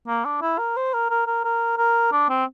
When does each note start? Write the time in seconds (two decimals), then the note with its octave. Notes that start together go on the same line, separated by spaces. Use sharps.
0.07 A#3
0.25 D4
0.41 E4
0.58 A#4
0.76 C5
0.93 A#4
1.10 A#4
1.27 A#4
1.44 A#4
1.78 A#4
2.12 D4
2.29 C4